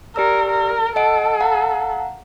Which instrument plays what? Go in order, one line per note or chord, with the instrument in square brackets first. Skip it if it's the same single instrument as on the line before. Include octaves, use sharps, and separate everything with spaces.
[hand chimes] G4 D5 E6 [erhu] A#4
[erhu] A#4
[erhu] A4 [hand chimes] D#5 F#5 D7
[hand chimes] F5 F#5 A#5